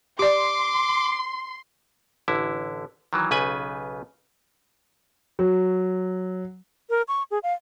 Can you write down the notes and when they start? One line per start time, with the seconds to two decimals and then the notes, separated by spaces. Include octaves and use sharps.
0.19 G4 D5 C6 D6
2.28 A1 D3 E4
3.13 D#3 E3 F#3
3.31 B1 C#3 B4 G#5
5.39 F#3
6.90 A#4
7.08 C#6
7.31 G#4
7.43 F5